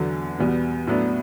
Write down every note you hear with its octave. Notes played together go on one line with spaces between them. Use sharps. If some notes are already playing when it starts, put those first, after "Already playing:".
Already playing: E2 D3 F#3
E2 B2 G3 B3
A2 F#3 B3 D4